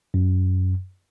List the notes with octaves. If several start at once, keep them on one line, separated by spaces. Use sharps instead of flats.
F#2